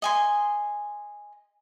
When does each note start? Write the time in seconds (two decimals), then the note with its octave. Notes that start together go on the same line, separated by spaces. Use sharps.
0.02 D#5 G#5 C6